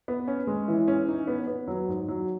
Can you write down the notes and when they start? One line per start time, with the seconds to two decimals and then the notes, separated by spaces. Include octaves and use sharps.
0.08 B3
0.28 C#4
0.47 G#3
0.68 E3
0.88 C#4
1.08 D#4
1.27 B3
1.48 B3
1.68 F#3
1.88 G#2
2.08 F#3